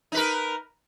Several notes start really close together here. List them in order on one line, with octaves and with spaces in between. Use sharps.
D#4 B4 A#4